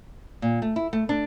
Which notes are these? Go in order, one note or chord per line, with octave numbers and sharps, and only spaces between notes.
A#2
A3
E4
A3
D4